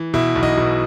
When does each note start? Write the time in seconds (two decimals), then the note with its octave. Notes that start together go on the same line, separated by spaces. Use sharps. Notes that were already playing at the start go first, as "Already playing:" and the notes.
Already playing: E3
0.14 B2 E4
0.35 B1
0.43 D#5
0.57 B2